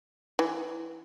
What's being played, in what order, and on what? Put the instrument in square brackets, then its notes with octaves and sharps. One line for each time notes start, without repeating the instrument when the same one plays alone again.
[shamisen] E3